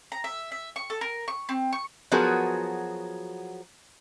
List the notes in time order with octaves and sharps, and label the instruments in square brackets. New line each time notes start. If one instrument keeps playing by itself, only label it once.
[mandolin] A#5
E5
E5
C#6
A4
A#4
C#6
C4
C#6
[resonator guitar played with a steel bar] F3 F#3 B3 F#4 G#4 A#4